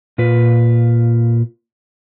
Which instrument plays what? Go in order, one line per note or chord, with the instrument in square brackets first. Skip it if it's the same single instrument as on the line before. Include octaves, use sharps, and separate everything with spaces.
[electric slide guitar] A#2 F4 B4